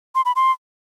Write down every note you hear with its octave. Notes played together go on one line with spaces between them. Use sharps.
C6
B5
C6